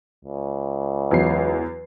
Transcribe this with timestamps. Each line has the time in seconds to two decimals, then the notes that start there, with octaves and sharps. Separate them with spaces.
0.25 C#2
1.11 E2 F#3 C7